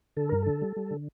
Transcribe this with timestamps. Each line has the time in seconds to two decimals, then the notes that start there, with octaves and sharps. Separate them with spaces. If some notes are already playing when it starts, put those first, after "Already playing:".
0.17 D3 A4
0.29 G2 A#4
0.43 D3 A4
0.62 G3
0.76 G3
0.91 D3